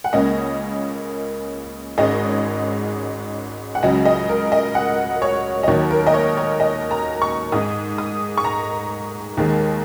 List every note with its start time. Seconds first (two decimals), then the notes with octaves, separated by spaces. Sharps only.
0.04 F#5
0.13 C#2 C#3 A#3 C#4 D#5
1.98 G#1 G#2 G#3 C#4 D#5
3.75 F#5
3.83 C#2 C#3 F#3 D#5
4.05 D#5
4.29 A#4
4.52 D#5
4.75 F#5
5.22 C#5
5.63 D#5
5.67 D#2 D#3 F#3 D#4 C#5
5.91 A#4
6.07 D#5
6.14 C#5
6.37 C#5
6.60 D#5
6.91 A#5
7.22 C#6
7.52 G#2 G#3 D#4 D#6
7.98 D#6
8.37 C#6
8.45 A#5
9.37 D#2 D#3 G#3